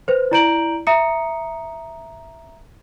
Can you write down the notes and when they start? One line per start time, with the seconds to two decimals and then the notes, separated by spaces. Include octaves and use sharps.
0.08 B4 C5
0.31 E4 D5 A#5 G6 D7 F#7
0.87 E5 A#5 D#6 C#7